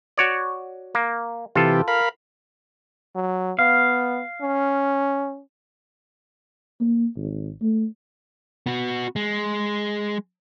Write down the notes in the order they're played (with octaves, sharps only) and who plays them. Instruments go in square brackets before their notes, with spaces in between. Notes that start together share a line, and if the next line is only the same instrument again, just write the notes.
[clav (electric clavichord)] F#4 C#5 D5
A#3
[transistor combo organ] C3 E3 G4 [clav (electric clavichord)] F4 A4
[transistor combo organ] A#4 F5 B5
[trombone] F#3
[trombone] B3 [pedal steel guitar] F5
[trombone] C#4
[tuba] A#3
G#1
A3
[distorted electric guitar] B3 F#4
G#3